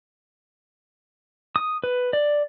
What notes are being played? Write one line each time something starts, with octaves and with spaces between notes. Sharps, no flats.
D#6
B4
D5